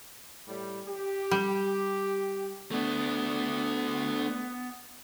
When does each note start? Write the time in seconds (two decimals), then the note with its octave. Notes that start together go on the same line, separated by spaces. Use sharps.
0.47 A2 G3
0.88 G4
1.31 G3
2.71 A3 B3 D4